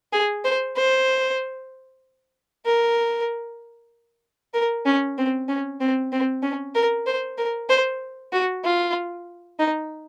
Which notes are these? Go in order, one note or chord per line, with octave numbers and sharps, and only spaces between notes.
G#4
C5
C5
A#4
A#4
C#4
C4
C#4
C4
C4
C#4
A#4
C5
A#4
C5
F#4
F4
D#4